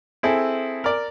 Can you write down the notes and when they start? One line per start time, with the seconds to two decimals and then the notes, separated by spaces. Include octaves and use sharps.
0.23 C4 E4 G#4 A4
0.84 A#4 D5